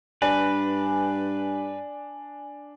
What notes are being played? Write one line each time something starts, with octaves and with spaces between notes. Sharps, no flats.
G2 D4 B4 G#5